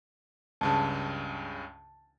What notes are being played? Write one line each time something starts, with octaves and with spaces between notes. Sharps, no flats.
C#2 G2 C#3 A5